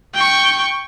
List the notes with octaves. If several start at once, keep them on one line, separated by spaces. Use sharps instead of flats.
G5 C#6